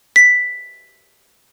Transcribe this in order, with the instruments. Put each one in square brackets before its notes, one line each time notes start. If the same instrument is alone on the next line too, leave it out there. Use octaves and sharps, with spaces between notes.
[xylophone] B6